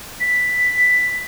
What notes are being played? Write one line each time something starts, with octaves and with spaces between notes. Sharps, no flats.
B6